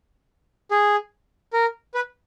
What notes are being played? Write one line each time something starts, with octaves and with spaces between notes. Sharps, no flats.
G#4
A#4
B4